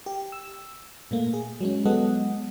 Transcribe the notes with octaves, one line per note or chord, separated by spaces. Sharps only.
G4
E6
A#2 A3 A#3
G#4
F#3 G#3 C#4
F#3 G#3 B3 A4 D#5 F#5